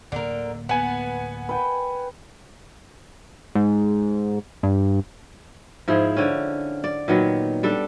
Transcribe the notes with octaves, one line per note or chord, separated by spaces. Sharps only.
D1 D3 A#3 A#4
B3 F#5 G#5
B4 G5
G#2
G2
G#2 F3 E4 G#4
D3 C#4
D5
A#2 D#3 F#3 B3
G3 D4 A4